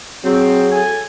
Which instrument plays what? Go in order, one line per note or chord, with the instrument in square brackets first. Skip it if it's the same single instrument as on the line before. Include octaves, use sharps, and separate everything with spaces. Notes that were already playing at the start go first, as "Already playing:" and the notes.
[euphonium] F#3 [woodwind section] C4 [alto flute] G#4
[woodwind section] A4 G#5